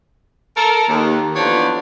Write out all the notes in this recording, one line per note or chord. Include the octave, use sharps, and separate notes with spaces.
A4 A#4
D#2
D3 E3 F3 B3 D4 C#5